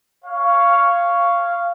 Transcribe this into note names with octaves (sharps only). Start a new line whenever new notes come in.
C#5 F5